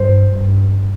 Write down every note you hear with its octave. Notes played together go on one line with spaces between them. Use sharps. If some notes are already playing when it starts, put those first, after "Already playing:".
Already playing: G2 C5
G2